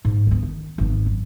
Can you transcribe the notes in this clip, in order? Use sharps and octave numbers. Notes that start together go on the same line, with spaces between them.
G#2
D2 B3
D#3
G#1 B3
F#2